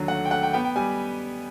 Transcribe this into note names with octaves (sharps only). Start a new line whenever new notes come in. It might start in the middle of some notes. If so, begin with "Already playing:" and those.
Already playing: D#2 D3 F#3
A3 F#5
G5
A3 F#5
G5
B3 G5
G5
G3 G#5